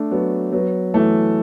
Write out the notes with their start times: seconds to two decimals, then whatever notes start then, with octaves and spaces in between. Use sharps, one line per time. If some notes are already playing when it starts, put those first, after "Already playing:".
Already playing: A3 D4
0.11 F#3 B3
0.52 F#3 B3
0.94 E3 A3